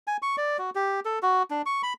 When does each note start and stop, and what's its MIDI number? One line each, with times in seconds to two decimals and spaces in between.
0.07 0.17 80
0.22 0.36 85
0.38 0.57 74
0.58 0.70 66
0.75 1.00 67
1.05 1.19 69
1.23 1.43 66
1.50 1.62 62
1.66 1.82 85
1.83 1.93 83